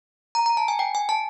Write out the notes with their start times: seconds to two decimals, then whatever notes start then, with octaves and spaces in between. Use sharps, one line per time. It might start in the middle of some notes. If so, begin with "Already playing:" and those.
0.35 A#5
0.46 A#5
0.57 A5
0.68 G#5
0.79 G5
0.95 G#5
1.09 A5